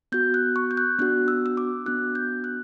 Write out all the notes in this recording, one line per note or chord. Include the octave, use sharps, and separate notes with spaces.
B3 F#4 G6
F#6
C#6
G6
F#6
B3 D4 F#4 F#6
E6
E6
D6
B3 D4 F#4 F#6
G6
F#6